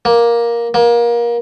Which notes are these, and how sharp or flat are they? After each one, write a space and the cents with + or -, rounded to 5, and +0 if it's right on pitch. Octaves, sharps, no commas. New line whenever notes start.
A#3 +10
A#3 +25